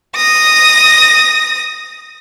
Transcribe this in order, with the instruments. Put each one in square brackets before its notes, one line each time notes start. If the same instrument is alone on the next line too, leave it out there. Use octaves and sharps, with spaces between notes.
[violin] D#6 A#6